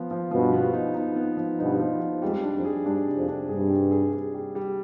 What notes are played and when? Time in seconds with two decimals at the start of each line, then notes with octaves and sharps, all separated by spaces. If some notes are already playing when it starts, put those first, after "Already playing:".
Already playing: F3 B3
0.11 F3
0.31 G2 B2 F3
0.53 B3
0.73 D#4
0.95 D#4
1.16 B3
1.37 F3
1.59 G2 B2 D#4
1.79 F3
2.01 D#4
2.22 F2 G#2 G3
2.43 D4
2.54 F2
2.65 G#4
2.85 G2 D4
3.07 C3
3.17 F2
3.28 D4
3.49 G2 G#4
3.70 G3
3.91 G#4
4.13 G#4
4.34 G3
4.55 G3